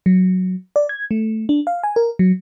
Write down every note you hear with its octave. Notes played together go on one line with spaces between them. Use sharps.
F#3
D5
G#6
A3
D4
F5
G#5
A#4
F#3